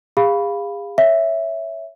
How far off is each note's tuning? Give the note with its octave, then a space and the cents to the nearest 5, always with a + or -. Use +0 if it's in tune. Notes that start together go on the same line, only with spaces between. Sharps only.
G#4 -40 F5 +0 B5 +0
C#5 +0 E5 +0